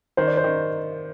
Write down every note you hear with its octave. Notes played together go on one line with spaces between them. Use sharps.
D#3 C5
D5
C5
D#3